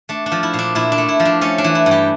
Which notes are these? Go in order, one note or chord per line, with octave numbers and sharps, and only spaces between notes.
A3 D4
D4
F3
E4
A#2
D4
A#2 E4
D4
A3
E4
F3
D4
A3 C#4
D4
E3
E4
G2
G4